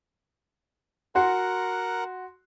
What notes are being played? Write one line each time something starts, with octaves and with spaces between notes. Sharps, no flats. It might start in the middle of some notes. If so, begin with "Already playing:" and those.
F#4 A#4 F#5 C6